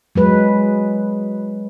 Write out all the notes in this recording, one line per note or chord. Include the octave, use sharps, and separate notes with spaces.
F#3 G#3 B4